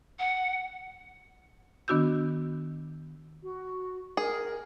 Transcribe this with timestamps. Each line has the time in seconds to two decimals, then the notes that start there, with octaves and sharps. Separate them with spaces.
0.19 F#5
1.88 D#3 B3 D4 F#4 E6 G6
3.43 F#4
4.17 G#4 A#4